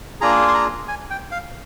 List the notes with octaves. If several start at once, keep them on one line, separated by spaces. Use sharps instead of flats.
A#3 D4 F4 G#4 A#5
C6
A#5
G#5
G5
F5